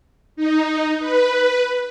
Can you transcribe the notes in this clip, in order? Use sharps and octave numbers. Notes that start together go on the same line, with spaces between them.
D#4
B4